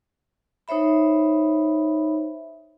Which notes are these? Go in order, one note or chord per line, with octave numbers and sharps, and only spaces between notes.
D#4 C5 C#5 E5 B5